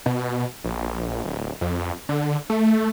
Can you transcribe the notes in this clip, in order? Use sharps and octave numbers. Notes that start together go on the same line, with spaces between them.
B2
A#1
D1
F2
D3
A3